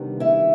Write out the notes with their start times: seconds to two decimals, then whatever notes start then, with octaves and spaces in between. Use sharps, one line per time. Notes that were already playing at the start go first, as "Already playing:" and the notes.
Already playing: C3 D#3 G3 B3 D4
0.20 E4 E5